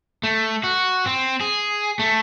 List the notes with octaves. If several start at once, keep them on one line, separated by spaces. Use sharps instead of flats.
A3
F#4
C4
G#4
A3